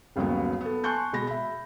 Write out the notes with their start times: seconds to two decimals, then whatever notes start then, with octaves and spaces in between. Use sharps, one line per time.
0.16 G1 D#2 C#3 F#3 B3
0.61 B3 A4
0.84 G#5 A5 C6 C#6 F#6 G6
1.13 B2 G#3 B5 A#6
1.27 E5 B5